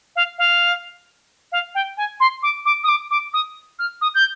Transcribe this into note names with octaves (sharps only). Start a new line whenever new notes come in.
F5
F5
F5
G5
G#5
C6
D6
D6
D#6
D6
D6
D#6
F6
D#6
G6